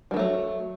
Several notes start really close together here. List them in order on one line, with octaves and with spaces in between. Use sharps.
G3 D#3 A3 F#3